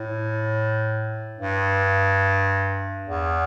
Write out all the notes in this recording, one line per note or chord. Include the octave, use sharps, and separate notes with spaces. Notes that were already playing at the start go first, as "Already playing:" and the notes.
Already playing: A2
G2
E2